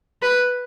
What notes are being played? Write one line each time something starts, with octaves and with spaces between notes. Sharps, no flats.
B4